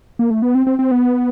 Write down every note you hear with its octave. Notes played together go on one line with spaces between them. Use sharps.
A#3
A3
B3
C4
C4
C4
B3